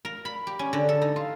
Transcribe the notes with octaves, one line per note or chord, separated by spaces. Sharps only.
A#4
B5
G4
C#4
D3
A4
D#4
F4